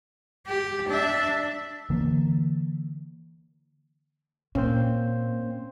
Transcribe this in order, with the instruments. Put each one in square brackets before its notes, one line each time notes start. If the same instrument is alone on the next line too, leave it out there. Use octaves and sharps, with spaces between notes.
[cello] G4
D4 E5
[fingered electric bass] D3 E3 A#3
[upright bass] A#2 [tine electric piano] A#3 C4 C5 [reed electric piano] C#4